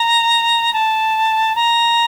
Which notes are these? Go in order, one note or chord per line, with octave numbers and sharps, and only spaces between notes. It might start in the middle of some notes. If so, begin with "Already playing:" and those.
Already playing: A#5
A5
A#5